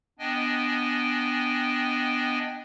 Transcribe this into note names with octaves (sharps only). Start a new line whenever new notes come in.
B3 D4 D#5 G5 G#5